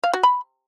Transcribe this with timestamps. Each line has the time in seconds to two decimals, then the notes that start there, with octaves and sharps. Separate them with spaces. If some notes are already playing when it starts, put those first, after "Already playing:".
0.04 F5
0.13 F#4
0.23 B5